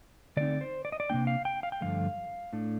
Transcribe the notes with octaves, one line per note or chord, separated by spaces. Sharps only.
D3 A3 C4 D#4 D5
C5
D5
D#5
D5
C3 G3 A#3 D4 G5
F5
G5
F5
G5
G2 D3 F3 A3 F5
A2 A3 D4